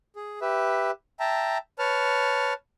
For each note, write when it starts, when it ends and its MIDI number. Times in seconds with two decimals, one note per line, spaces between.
0.16 0.39 68
0.41 0.91 67
0.41 0.91 71
0.41 0.91 76
1.20 1.58 76
1.20 1.58 79
1.20 1.58 81
1.20 1.58 82
1.79 2.54 71
1.79 2.54 73
1.79 2.54 81
1.79 2.54 89